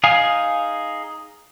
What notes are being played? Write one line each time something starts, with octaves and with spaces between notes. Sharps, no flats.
D#4 G#4 F5 G#5